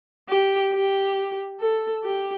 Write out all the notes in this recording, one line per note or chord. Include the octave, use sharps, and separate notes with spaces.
G4
G4
A4
G4